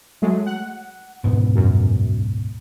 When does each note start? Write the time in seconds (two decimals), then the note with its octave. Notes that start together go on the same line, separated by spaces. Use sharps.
0.22 F#3 G#3 A3
0.46 F#5
1.24 D2 G#2 B2
1.56 F#2